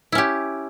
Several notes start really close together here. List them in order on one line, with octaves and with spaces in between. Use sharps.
E4 C#4 G4